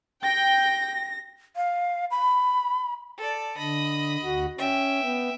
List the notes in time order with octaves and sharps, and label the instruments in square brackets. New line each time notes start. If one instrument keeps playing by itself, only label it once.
[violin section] G5 [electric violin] A#6
[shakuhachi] F5
B5
[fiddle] A4 D5
[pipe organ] D3 [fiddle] D#5 B5
[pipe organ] D2 F#4
[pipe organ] C#4 [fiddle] E5 G5
[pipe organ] B3